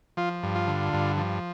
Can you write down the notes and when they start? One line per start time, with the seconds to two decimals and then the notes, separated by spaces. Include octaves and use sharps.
0.17 F3 F4
0.43 G2
0.55 F4
0.67 D3
0.93 G2
1.17 F3